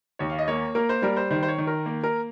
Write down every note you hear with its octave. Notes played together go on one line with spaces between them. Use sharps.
D#2 C#5
F5
D#5
A#3 C#5
A#3 A#4
C5
G3 A#4
C5
D#3 C5
C5
C#5
D#3
A#4
A#3
A#4